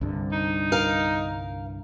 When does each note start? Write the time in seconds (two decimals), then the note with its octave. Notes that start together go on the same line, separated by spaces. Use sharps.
0.01 C2 G2 D3
0.32 D#4
0.72 A#4 F5